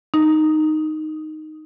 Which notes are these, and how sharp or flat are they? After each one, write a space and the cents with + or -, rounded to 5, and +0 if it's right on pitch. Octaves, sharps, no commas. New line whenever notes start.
D#4 -5